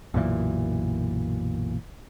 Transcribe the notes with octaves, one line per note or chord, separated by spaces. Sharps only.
B1 F#2 A#2 E3